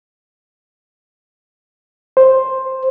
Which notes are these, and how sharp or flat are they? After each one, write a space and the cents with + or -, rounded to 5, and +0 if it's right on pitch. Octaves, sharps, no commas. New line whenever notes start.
C5 +5